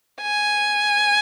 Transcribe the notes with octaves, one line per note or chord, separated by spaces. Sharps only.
G#5